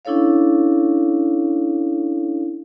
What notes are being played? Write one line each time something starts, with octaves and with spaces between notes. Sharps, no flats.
C#4 D4 E4 A4 C#5 F5